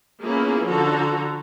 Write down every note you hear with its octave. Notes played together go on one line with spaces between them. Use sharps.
A#3 B3 C#4 E4 F4 G#4
D3 F3 F#4 A4 A#5